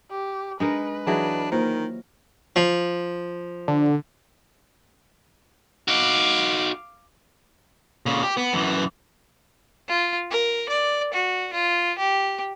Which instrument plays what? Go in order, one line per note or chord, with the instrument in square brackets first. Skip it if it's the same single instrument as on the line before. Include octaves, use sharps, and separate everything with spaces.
[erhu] G4
[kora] G#3 D#4 A#4 [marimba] D4 [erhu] B4
[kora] E3 F#3 D#4 [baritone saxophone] D4 [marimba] G#4
[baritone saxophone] D#3 [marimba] A#3 F4 C5 [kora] A#4
[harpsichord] F3
[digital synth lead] D3
[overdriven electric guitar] D#4 F#4 [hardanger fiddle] F5 D6
[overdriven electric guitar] A#2 C#3
G4
B3
F#2 E3
[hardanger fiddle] F4
A#4
D5
F#4
F4
G4